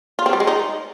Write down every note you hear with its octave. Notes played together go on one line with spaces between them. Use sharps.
F4
C4
G3
G#3
D#4